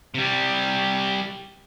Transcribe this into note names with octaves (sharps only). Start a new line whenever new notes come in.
C3 G3